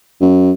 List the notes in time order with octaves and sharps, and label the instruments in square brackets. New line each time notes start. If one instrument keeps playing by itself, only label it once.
[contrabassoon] F#2